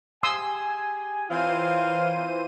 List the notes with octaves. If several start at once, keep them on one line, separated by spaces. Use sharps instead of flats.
G4 G#4 G#5 C6 D#6 E6
E3 C4 F4 A#4 C5 C#5 F5 D#7